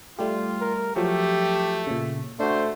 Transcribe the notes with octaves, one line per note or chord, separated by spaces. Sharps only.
G3 A3 F4 G4
A#4
F3 F#3 A3 G4
A#2 C#3
A3 D4 F#4 C5